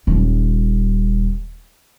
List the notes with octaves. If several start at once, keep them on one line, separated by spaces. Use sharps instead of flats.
D#1 G3